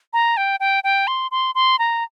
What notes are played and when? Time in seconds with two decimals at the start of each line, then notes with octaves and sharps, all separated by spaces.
0.13 A#5
0.37 G5
0.60 G5
0.84 G5
1.07 C6
1.31 C6
1.55 C6
1.79 A#5